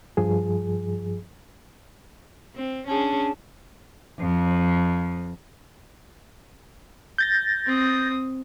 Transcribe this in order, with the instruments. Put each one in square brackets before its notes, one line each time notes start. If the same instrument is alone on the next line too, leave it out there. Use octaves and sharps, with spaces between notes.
[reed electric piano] G2 F3 G#4
[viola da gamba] C4
[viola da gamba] C#4 D4 G#4 [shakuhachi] A5
[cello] F2
[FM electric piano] G6 A6 A#6
[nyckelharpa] C4 D#6